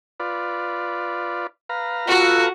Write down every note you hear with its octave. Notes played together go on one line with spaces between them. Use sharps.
F4 B4 D5
B4 F5 A#5
F4 F#4 A4 F#5